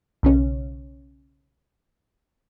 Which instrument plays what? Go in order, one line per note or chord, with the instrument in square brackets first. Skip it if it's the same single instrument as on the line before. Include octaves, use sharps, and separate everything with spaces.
[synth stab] B1 C#3 C#4